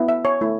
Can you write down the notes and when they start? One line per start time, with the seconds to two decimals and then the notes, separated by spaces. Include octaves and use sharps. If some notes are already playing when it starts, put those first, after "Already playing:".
Already playing: B3 E4
0.09 E5
0.25 C#5
0.41 A3 E4